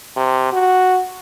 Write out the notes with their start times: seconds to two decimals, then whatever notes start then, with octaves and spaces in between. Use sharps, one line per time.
0.16 C3
0.53 F#4